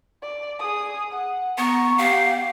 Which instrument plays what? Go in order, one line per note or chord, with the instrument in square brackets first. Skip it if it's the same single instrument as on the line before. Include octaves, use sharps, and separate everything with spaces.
[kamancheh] D5
G#4 D#6
F#5
[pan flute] B3 [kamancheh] A#5 C#6
[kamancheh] G4 F#5 [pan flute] F5